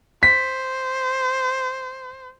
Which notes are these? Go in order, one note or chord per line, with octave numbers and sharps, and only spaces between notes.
C5 B6